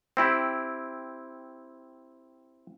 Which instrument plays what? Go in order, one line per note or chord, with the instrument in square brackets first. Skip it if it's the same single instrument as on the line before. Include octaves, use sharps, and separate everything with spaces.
[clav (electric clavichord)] C4 E4 G4